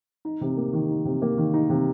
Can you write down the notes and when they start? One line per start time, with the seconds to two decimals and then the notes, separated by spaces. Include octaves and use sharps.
0.25 D#4
0.41 C3
0.57 A#3
0.73 D#3
0.89 D#4
1.05 C3
1.22 A#3
1.37 D#3
1.54 D#4
1.70 C3